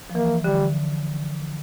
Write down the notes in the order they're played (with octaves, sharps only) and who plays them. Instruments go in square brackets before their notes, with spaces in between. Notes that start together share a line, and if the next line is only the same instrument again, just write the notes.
[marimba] F3
[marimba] E3 [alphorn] A#3
[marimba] D3 [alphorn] G3